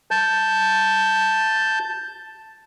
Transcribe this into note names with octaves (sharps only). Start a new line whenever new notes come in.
A5 G6